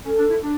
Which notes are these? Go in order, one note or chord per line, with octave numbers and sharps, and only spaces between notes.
C#4 A4
D4
E4
D4